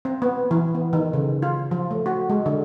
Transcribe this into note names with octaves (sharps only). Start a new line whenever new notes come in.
C4
B3
E3
B3
D#3
C#3
F4
F3
A3
F#4
G#3
D3